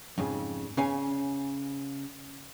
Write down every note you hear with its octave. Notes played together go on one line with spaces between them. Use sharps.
F2 G#2 C#3
C#3 C#4 F5 G#5